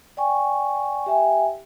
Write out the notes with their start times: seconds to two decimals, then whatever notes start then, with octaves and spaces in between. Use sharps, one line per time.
0.17 D5 G5 G#5 C#6
1.06 G4 E5 G5 G#5